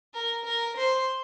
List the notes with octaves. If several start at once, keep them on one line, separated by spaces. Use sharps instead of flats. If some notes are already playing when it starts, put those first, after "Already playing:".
A#4
A#4
C5